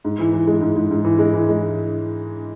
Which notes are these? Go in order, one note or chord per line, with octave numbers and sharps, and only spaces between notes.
G#2
E3
E3
G#3
G#2
G#2
G#2
E3
G#3
E3
G#3